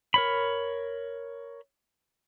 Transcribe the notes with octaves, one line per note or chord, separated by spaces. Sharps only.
A#4 C#5 B5